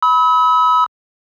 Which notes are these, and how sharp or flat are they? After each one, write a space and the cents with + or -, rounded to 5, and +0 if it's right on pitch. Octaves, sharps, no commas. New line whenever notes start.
B5 +0 E6 -45